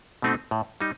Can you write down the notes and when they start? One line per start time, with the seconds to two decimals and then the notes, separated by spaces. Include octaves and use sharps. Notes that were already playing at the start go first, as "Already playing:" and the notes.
0.22 B2 A3 C4 D#4
0.51 A2
0.80 G3 D#4